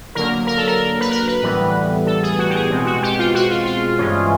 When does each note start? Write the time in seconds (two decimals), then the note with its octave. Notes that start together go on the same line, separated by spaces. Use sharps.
0.15 D3 F#3 A#3 A#4
0.47 A#4
0.57 A4
0.67 A#4
1.01 B4
1.11 A#4
1.27 B4
1.42 A2 E3 G3 B3
2.07 A4
2.23 G#4
2.39 F#4
2.49 G4
2.55 G#4
2.70 B2 G#3 C4
2.86 F#4
3.03 G4
3.19 F4
3.34 F#4
3.50 F4
3.66 F4
3.98 G2 E3 G#3 C#4 F4